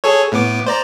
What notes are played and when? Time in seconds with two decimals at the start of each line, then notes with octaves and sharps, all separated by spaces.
0.04 G#4 A4 C#5
0.32 A2 B3 D6
0.66 C5 D5 A#5